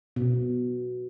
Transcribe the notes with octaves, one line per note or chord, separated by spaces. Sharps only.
B2